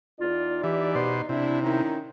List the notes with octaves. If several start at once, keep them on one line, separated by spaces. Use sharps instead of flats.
E2 D#4 F4 D5
E3 G4
B2 C5
C3 D4 E4
D#3 C#4 D#4 E4